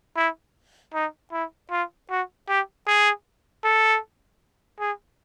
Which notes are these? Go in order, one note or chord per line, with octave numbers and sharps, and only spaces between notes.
E4
D#4
E4
F4
F#4
G4
G#4
A4
G#4